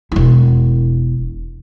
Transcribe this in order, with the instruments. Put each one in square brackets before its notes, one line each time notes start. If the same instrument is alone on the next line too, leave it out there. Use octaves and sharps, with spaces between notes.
[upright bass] E1 E4